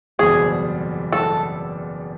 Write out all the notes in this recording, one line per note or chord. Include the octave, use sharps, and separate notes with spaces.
F#1 E2 B2 G3 C4 G#4
A4